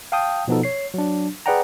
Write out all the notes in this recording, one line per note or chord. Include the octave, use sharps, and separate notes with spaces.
F5 G5 A5 D#6 G6
B2 F3 B3 D#4 A4
C#5 C7
F#3 D4
G#4 B4 D5 F#5 G5 A#5